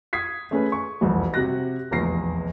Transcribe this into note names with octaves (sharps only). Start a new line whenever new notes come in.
D#6 G#6 B6 C7
A3 C#4 G#4 B4
C#6
E1 C2 F2
C3 F#4 F#6 A#6
F1 A#1 E2 A#6 C7